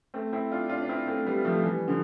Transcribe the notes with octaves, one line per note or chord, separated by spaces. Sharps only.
A3 C4
C4 E4
D4 F4
D4 F4
D4
C4 E4
A3 C4
G3 B3
F3 A3
E3 G3
D3 F3